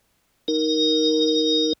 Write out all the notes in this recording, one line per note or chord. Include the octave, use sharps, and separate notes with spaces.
D#4 A#4